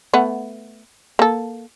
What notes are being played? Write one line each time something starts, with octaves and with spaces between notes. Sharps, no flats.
A3 B3 F#5
A#3 A4